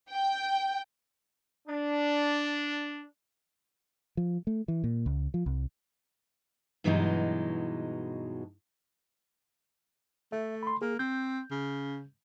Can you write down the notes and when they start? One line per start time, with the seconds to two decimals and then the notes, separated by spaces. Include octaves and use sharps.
0.10 G5
1.68 D4
4.17 F3
4.47 A3
4.68 E3
4.84 A#2
5.06 C#2
5.34 F3
5.46 C2
6.84 G2 B2 E3 F#3 G#3 D#4
10.32 A3 E5
10.63 B5 C6
10.82 A#3 G#4
10.99 C4 G6
11.51 C#3